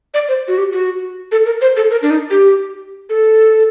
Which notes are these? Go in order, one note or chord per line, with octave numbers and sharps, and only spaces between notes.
D5
C5
F#4
G4
F#4
A4
A#4
C5
A4
A#4
D4
D#4
G4
A4